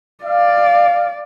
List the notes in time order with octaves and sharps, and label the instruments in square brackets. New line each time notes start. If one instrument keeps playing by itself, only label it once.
[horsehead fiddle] D5 [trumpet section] F5